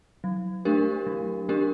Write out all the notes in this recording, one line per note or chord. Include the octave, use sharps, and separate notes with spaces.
F#3
A3 D4 G4 A#4
F#3
A3 D4 G4 A#4